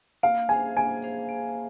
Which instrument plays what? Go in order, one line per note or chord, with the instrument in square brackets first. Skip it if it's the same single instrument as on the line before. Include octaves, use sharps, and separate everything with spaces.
[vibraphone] A#3 [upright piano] F5
[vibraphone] G#4 C5 F5 [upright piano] G#5
[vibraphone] A#3 [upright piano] G#5
[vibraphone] G#4 C5 F5
A#3